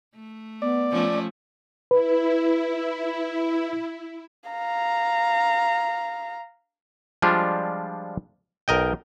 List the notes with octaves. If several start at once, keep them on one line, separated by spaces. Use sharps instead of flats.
A3
B3 D5
F3 A3 C#4
E4 B4
F5 A#5
F3 G3 G#3 D4 F4
B1 A#4 D#5 G5